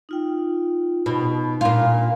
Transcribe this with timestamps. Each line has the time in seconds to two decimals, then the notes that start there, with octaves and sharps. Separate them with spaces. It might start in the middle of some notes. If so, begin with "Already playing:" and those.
0.09 D#4 F4 G5
1.06 B2 D#4
1.61 A#2 F4